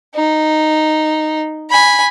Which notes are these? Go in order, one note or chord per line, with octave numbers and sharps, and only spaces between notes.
D#4
G#5 B5